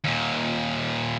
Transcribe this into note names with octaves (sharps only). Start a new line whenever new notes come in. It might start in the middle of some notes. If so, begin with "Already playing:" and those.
D#2 A#2